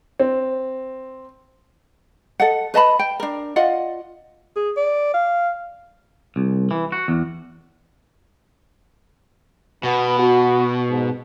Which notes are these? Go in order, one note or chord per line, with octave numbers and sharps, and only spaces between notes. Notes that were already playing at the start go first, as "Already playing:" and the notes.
C4
A4 D#5 F#5
B4 D#5 A5 B5
G5
D4 A#4
F4 D5 D#5 F#5
G#4
D5
F5
C2
E3
F#4
E2
B2 B3
F#4
G#2